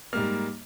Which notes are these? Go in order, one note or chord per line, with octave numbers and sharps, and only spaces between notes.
G#2 G3 A#3 F6